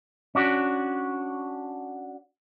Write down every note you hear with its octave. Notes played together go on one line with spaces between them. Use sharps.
C#4 D4 F#4